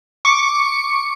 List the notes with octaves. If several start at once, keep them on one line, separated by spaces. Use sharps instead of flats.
C#6 D6 C#7